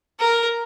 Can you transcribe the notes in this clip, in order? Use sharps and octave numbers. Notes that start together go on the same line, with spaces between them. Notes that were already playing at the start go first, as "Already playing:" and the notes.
A#4